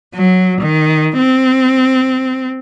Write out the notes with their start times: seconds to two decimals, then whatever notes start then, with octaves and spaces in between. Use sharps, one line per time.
0.15 F#3
0.61 D#3
1.18 C4